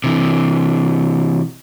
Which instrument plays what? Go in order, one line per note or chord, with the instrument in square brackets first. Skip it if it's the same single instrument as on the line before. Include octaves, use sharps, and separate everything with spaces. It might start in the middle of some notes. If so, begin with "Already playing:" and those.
[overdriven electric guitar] C3 E3